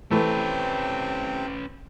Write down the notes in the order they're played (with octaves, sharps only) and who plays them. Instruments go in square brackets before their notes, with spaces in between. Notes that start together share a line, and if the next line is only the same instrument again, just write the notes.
[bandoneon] C3 C4 G5 [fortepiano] E3 A3 [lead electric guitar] C#4 B4